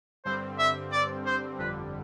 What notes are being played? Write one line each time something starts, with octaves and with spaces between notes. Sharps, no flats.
G2 D3 G3 C4 C5
E5
D5
C5
G1 F2 D3 G3 B4